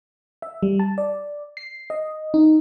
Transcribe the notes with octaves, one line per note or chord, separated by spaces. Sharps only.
E5
G3
A5
D5
C7
D#5
D#4